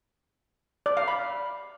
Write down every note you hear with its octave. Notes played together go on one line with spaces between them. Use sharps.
D5
F5
B5